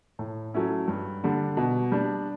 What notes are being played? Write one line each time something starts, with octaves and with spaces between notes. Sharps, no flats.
A2
F#3 A3 C#4 E4
G2
D3 G3 D4
B2
G3 D4